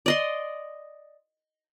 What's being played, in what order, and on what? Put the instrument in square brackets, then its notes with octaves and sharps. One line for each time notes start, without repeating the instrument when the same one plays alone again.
[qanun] D5 D#5 C6